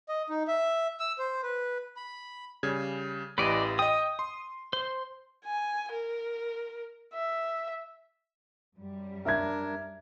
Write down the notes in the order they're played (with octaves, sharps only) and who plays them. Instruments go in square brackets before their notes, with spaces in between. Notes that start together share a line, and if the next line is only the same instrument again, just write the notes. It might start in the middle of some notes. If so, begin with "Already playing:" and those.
[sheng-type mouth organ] D#5
D#4
E5
E6
C5
B4
B5
[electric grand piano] C#3 G3 G#6
[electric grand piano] A1 E3 G4 [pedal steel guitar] B4 D5 D#5
[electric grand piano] D#5 G5 [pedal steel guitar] D#6
[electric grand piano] C6
[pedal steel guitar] C5
[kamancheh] G#5
A#4
E5
[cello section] F#2 G3
[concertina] D4 A#4 [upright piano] E5 G#6